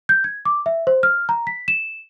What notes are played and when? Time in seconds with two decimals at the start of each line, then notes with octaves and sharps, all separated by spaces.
0.09 G6
0.24 G#6
0.45 D6
0.66 E5
0.87 C5
1.03 F6
1.29 A#5
1.47 B6
1.68 E7